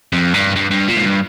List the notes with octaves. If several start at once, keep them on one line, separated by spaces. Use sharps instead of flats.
F2
G2
G2
G2
A#2
G#2
G2